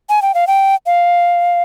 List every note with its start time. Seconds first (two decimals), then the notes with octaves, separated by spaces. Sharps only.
0.10 G#5
0.22 G5
0.35 F5
0.47 G5
0.86 F5